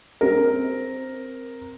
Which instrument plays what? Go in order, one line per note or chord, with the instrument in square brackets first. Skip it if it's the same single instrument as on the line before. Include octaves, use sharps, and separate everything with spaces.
[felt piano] C4 A#4